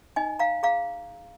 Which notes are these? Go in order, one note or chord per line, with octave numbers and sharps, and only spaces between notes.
D#4 D#5 G#5
F5 A#5
G#4 F5 A#5